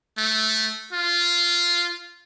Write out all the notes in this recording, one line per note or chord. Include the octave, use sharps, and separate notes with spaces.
A3
F4